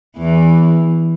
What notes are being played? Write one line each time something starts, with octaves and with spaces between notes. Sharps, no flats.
E2 E3